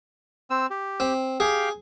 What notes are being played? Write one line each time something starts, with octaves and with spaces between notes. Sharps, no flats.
C4 E6
G4
C4
G4 G#4 F5 G5